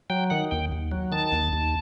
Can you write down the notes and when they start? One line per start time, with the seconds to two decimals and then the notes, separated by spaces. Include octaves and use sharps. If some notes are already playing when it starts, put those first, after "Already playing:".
0.10 F#3 G5
0.30 D#3 F#5
0.51 D#2 G5
0.72 D#2
0.92 F#3
1.12 D#3 A5
1.32 D#2
1.53 D#2